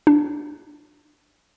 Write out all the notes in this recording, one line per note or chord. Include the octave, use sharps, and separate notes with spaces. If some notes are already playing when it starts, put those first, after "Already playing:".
D4